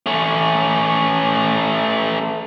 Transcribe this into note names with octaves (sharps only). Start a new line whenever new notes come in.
A3 C#4